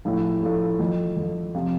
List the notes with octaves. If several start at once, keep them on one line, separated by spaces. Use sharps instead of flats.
A2 F3 A3 E4
A2 F3 A3 E4
F2 D3 A3
F2 D3 A3
C3 F3 C4